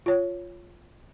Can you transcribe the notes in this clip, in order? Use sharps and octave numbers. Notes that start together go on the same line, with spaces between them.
F4 C#5